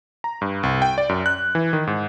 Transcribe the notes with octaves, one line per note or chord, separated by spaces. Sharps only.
A#5
G2
C2
G5
D5
F#2
F#6
E3
D#3
G#2